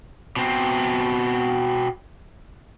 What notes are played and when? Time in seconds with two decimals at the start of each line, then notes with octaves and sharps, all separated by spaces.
0.36 B2 C4